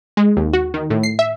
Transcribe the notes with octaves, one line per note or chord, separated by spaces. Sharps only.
G#3
D#2
F#4
D#3
A2
C7
E5